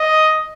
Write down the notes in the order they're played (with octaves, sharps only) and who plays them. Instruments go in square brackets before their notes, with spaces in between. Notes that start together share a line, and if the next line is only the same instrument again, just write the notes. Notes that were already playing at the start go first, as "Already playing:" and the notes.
Already playing: [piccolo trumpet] D#5